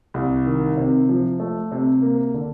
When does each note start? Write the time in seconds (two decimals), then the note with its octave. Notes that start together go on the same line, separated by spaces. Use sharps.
0.14 C2
0.46 D#3
0.77 C3
1.09 F3
1.40 A3
1.72 C3
2.02 A#3
2.34 D3